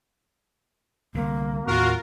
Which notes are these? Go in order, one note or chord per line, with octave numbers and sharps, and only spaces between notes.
C2 D3 A3 A#3
D#2 A2 B3 F4 F#4 A#4